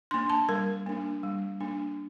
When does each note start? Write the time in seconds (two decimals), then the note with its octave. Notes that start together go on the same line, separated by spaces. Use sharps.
0.11 A#3 D4 C6
0.30 A5
0.49 G3 A#4
0.86 A#3 D4
1.23 G3
1.60 A#3 D4